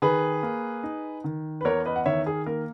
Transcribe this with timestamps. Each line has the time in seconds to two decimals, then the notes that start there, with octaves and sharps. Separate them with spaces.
0.02 D#3 G#4 B4
0.43 A#3
0.83 D#4
1.24 D#3
1.61 B4
1.65 E2 A#4 C#5
1.86 B4 D#5
1.96 F#5
2.06 D#3 C#5 E5
2.26 G#4
2.46 A#3 A#4